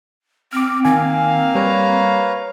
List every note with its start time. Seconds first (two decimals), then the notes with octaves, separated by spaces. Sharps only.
0.53 C4 D6 F6
0.85 D#3 A#3 C4 F5 G#5
1.55 G3 B4 C#5 A#5